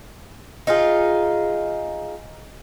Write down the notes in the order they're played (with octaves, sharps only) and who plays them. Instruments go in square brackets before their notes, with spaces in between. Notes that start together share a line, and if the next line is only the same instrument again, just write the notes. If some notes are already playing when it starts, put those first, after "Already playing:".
[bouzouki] D#4 F4 G#4